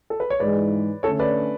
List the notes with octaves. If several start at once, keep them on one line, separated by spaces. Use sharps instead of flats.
A4
B4
C#5
G#2 E3 G#3 B4 D5
D3 A3 C#4 A4 C#5
B4 D5